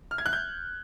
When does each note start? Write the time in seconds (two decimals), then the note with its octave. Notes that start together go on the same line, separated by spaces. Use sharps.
0.11 F6
0.18 G#6
0.26 F#6
0.33 G6